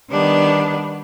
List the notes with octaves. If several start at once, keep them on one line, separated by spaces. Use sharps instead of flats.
D#3 G3 B3 D4